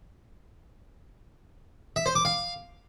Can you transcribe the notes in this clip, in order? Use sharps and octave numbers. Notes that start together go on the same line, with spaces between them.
E5
C5
D6
F5